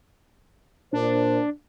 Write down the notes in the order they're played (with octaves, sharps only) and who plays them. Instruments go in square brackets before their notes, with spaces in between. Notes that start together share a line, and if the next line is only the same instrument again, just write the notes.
[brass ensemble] A#2 C5 [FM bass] D4